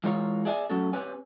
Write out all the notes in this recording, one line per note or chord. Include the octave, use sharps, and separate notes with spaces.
E3 G#3 F4 A#4 C#5
G#4 D5 E5 F#5 G#5
F#3 A3 C#4 F#4 A4
C4 G4 B4 C#5 G#5